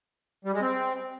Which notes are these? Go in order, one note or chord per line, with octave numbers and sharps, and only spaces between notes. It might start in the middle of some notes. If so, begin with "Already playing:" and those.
G3
G#3
C4